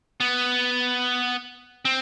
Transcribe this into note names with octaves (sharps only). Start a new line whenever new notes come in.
B3
C4